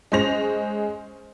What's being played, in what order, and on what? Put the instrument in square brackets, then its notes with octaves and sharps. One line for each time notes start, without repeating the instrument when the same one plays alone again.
[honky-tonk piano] G#3 C#4 C5 A#6 F7